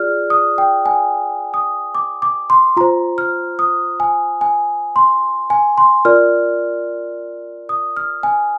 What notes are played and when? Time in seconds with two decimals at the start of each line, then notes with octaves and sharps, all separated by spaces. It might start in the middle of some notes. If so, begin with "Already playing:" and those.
Already playing: F4 G#4 D5 F6
0.30 D#6
0.58 G5
0.86 G#5
1.54 D#6
1.95 D6
2.22 D6
2.50 C6
2.77 F4 C5 A#5
3.18 F6
3.59 D#6
4.00 G#5
4.41 G#5
4.96 C6
5.50 G#5
5.78 C6
6.05 F4 A#4 D5 F6
7.69 D#6
7.97 F6
8.23 G#5